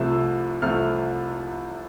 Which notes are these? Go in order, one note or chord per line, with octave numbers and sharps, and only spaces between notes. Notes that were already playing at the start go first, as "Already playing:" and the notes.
Already playing: C2 C3 F3 A3 E6
C2 C3 F3 A3 F6